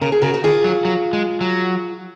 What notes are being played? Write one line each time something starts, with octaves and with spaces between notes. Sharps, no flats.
C#3 A#4
G#4
C#3 F#4 A#4
F#4
D#3 F4 G#4
F#3
F#3
G#3
F#3